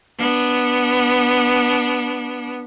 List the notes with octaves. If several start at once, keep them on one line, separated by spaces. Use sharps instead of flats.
B3 D4